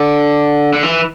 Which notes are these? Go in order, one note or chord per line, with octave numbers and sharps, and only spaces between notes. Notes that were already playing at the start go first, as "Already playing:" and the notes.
Already playing: D3
D3
E3